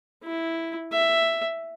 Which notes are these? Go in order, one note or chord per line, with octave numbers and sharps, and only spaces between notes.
E4
E5